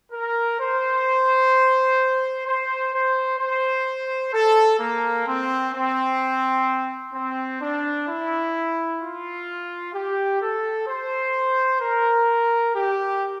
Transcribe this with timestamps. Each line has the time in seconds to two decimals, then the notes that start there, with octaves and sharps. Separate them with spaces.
0.12 A#4
0.60 C5
2.47 C5
2.94 C5
3.40 C5
4.34 A4
4.80 A#3
5.28 C4
5.73 C4
7.14 C4
7.61 D4
8.08 E4
9.01 F4
9.94 G4
10.42 A4
10.88 C5
11.81 A#4
12.75 G4